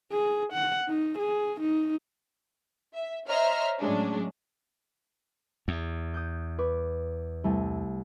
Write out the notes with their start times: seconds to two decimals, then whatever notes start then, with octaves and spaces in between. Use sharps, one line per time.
0.12 G#4
0.53 F#5
0.88 D#4
1.18 G#4
1.61 D#4
2.94 E5
3.28 C5 C#5 D#5 E5 A#5 F6
3.80 A2 F#3 G#3 C#4 D4
5.68 E2
6.14 D#6 F#6 G6
6.59 B4 C#6 D6
7.44 C2 A3 G#5